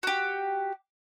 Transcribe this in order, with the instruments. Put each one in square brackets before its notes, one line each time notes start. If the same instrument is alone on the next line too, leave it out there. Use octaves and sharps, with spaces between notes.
[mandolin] F#4 G4